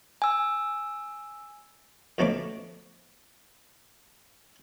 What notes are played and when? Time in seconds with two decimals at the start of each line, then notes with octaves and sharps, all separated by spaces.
0.22 G#5 E6
2.18 F2 B2 A3 C#4 B4 D6